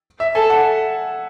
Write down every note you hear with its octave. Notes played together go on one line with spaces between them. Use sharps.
E5
A4 G#5
F#5